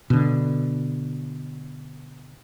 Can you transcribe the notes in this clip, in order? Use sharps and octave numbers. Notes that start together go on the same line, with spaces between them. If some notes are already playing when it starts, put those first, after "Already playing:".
B2 D3